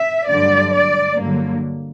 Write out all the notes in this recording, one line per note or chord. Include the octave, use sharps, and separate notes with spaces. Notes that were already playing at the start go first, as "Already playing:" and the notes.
Already playing: E5
G2 D3 F#3 D5
D5
G2 D3 F#3 A#3